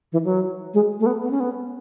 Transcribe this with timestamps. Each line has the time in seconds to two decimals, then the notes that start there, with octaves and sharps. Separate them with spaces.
0.12 E3
0.25 F#3
0.74 G#3
1.00 A3
1.06 B3
1.23 B3
1.31 C#4
1.40 B3